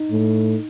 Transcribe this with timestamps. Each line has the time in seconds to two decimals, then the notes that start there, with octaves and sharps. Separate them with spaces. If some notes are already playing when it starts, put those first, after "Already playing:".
Already playing: D#4
0.11 A2